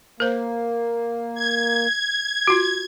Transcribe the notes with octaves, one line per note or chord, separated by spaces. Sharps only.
A#3 A#4 C5
G#6
F4 F#4